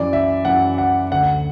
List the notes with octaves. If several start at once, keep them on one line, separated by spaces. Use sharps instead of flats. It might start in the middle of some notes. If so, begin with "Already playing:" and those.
Already playing: F#2 E3 D5
E5
F#2 E3 F#5
F#5
D2 D3 F#5